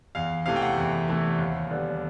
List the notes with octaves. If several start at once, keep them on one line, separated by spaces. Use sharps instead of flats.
E2 F5
C3 E3 A3 F5
G5
F#5
E2
C3 E3 A3
D#2
D3 G3 B3